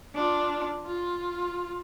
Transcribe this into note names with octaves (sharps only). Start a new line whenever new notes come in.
D4 F4
F4